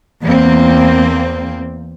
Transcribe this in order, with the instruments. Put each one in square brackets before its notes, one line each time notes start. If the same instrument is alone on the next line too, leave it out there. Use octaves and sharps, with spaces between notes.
[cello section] E2 A#3 C4